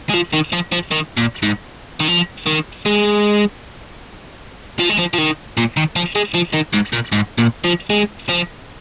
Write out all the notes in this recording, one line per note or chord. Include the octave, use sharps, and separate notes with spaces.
G#3
F3
D#3
F3
F3
D#3
A#2
G#2
D#3
F3
D#3
G#3
F3
G#3
F3
F3
D#3
A#2
D#3
F3
G#3
F3
D#3
G#2
A#2
G#2
A#2
F3
G#3
F3